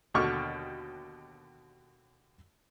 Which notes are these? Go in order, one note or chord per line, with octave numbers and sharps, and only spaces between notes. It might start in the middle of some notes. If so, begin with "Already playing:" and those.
D#2 B2 D3 C#6 D6 F6